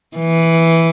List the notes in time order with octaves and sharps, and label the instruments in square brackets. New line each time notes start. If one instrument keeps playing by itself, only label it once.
[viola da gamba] E3